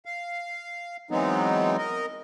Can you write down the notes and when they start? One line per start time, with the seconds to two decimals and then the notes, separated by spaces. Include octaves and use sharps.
0.05 F5
1.11 E3 F#3 G#3 B3 C4 D#4
1.78 A#4 D#5